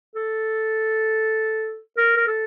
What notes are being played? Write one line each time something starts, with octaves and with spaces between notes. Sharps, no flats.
A4
A#4
A#4
A4